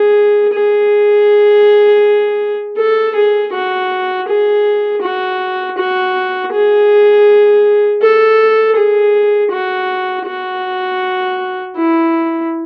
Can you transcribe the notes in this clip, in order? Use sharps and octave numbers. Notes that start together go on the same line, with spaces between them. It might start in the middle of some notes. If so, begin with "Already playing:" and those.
Already playing: G#4
G#4
A4
G#4
F#4
G#4
F#4
F#4
G#4
A4
G#4
F#4
F#4
E4